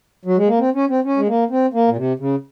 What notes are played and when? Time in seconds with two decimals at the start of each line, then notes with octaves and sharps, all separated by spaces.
0.25 F#3
0.37 G#3
0.48 A#3
0.59 C4
0.75 C#4
0.90 C4
1.05 C#4
1.17 G#3
1.28 A#3
1.50 C4
1.74 A#3
1.88 A#2
1.97 C3
2.20 C#3